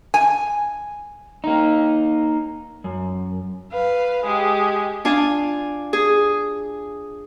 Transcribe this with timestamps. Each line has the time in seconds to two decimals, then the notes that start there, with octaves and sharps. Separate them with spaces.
0.14 G#5
1.44 A#3 D#4
2.84 F#2
3.72 B4 F5
4.24 G#3 G4
5.05 D4 F4 G#5
5.93 G#4